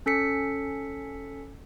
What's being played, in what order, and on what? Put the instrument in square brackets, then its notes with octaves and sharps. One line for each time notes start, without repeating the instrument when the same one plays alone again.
[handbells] C#4 A4 B6 C#7